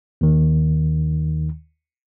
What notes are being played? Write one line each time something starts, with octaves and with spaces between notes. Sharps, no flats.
D#2 D#3